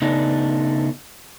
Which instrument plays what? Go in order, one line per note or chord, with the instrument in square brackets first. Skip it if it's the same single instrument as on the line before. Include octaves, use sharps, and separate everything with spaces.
[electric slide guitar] C#3 A3 B3 D4 D#4